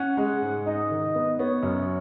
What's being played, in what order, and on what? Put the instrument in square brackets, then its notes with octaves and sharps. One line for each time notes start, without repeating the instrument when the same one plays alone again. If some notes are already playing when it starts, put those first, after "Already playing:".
Already playing: [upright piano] C#4 [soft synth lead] F#5
[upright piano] G#3
G#2
[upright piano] D#4 [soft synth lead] D#5
[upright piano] D#3
B3
[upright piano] B3 [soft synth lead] C#5
[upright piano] F#2